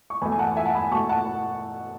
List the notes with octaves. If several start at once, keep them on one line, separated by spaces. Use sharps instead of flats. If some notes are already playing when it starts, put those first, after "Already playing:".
C#6
E2 B2 A3 G#5 B5
G#5
F#5 A5
E5 G#5
F#5 A5
G#5 B5
B2 A3 A5 C#6
F#5 A5